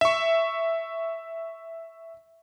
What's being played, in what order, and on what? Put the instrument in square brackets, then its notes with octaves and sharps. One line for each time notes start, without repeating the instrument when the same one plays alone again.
[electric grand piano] E5 C#6